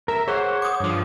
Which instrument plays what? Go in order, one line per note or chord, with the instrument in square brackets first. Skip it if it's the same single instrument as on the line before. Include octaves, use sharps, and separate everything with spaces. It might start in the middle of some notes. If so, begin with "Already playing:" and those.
[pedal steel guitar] A#4 [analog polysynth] E5
[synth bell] G#4 [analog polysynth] C5 [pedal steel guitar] C#5 F#5
[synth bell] D6 D#6
[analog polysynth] G2 F3